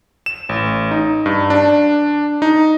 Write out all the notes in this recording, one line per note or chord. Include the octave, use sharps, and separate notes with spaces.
E7
A1
D#4
G2
D4
D#4